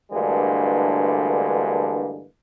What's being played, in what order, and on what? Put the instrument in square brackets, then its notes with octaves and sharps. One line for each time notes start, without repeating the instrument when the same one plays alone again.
[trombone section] D2 G2 D3 E3 G#3 A#3